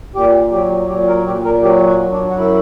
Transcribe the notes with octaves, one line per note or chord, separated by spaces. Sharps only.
A#2 G4
F#3 G4
A#2 G4
A#4
A#2 G4
A#4
F#3 G4
F#4
F#3
D4
F#4
F#2 E4